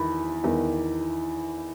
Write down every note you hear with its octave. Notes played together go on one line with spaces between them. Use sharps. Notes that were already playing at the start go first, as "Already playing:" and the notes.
Already playing: E2 D#3 B5
E2 D#3